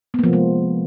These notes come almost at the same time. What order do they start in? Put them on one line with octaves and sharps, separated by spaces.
B3 A#3 F3 C3 G#3